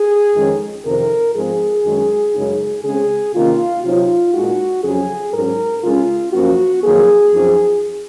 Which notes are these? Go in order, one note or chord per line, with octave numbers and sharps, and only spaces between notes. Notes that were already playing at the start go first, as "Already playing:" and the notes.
Already playing: G#4
F2 D#3 G#3 C#4
F2 C3 D#3 A#4
G#2 F3 G#3 C4 G#4
F#2 D#3 G#3 C#4
F#2 C#3 G#3 D#4
C#3 G#3 C4 G#4
C3 D#3 A#3 C#4 F4
C3 F#3 C4 D#4 F4
A#2 G#3 D#4 F#4
F2 C#3 F#3 C#4 G#4
G#2 F#3 C#4 A#4
C#3 G#3 C#4 F4
F#2 F3 A#3 C#4 F#4
F2 D#3 F#3 A#3 G#4
F#2 F3 C4 D#4